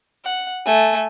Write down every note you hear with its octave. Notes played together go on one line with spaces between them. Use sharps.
F#5
A3 G#5